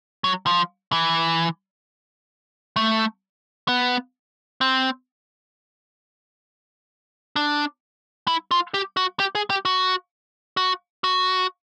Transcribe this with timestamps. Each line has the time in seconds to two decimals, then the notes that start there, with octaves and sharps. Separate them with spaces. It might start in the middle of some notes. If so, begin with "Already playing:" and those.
0.24 F#3
0.46 F3
0.92 E3
2.76 A3
3.68 B3
4.61 C4
7.36 D4
8.28 E4
8.51 F4
8.74 G4
8.97 F#4
9.20 G4
9.35 G#4
9.50 G4
9.65 F#4
10.57 F#4
11.04 F#4